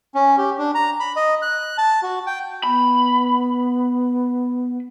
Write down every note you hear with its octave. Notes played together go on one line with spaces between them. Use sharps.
C#4
G4
D4
A#5
B5
D#5
F#6
A5
F#4
G5
B3 B5